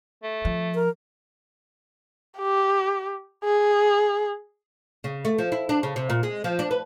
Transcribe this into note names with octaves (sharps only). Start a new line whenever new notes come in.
A3
F3
A#4
G4
G#4
C#3
A3
F3
E4
D4
C#3
C3
A#2
G#3
F3
D4
B4